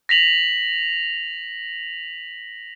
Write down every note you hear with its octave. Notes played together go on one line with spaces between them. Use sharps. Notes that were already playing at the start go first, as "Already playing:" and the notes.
A#6 B6 F7 F#7